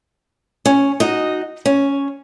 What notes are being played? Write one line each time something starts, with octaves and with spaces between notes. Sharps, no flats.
C#4
D#4 F#4 D#5
C#4